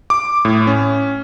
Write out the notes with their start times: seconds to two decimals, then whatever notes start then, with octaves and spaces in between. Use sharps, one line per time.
0.10 D6
0.45 A2
0.67 C#4